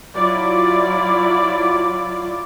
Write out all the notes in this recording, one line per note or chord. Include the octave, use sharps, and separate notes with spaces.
F#3 E4 F4 D5